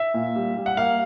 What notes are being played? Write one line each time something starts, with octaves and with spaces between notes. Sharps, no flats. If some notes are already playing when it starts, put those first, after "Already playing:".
Already playing: E5
A#2
G3
G3
F#5
A#3 F5